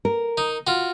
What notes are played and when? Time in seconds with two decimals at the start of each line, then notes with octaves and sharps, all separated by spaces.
0.05 A#4
0.38 D#4
0.67 F4 F#4